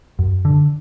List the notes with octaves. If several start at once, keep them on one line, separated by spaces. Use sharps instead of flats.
F#2
D3